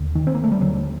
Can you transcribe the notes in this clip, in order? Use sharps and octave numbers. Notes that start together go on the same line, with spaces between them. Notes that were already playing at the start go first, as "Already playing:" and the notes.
Already playing: D#2 D3
D#3
C4
A#3
A3
G3
D#2 D3 F#3